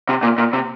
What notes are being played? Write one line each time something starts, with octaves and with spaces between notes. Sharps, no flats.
C3
A#2
A#2
C3